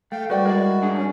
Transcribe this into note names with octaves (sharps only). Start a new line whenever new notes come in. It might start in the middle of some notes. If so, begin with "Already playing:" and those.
A3 F5 G5
G3 F#4 B4 D5 G5
G#3 E4 A#4 D5
G#2 D4 G#4
C#4